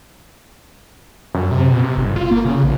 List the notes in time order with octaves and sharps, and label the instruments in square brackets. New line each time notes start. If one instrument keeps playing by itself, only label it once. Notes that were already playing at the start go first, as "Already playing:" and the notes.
[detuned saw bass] F#2
C3
B2
C3
G1
F4
A#3
C#3
A#1